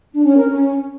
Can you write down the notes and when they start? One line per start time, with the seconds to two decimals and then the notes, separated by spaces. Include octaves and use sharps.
0.13 D4
0.25 C#4
0.37 A#4
0.49 C#4